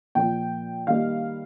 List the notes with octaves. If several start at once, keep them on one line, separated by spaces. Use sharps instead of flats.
A#2 F3 A#3 G5
D#3 G3 A#3 F5